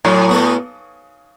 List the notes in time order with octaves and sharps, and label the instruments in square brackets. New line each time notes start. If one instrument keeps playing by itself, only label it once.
[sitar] A2 [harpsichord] F#3
[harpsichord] B3 F#4 A4